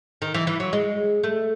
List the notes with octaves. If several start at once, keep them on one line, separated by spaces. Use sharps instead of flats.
D#3
E3
E3
F#3
G#3
A3